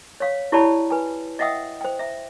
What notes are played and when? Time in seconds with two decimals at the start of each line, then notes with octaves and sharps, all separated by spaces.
0.20 C#5 F5
0.52 E4 G4 C#5 D5 A5 B5
0.90 B4 G#5
1.39 D#5 E5 F#5 G5 D#6 E6
1.81 C5 G5
1.99 E5